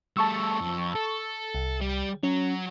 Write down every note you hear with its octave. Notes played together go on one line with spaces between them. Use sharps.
G3 A3 A5 C#6 E6
F2
A4
C2
G3
F#3 C#4